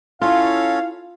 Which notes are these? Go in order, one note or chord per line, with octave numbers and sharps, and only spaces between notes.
C#4 E4 F4 A4 C#5 F5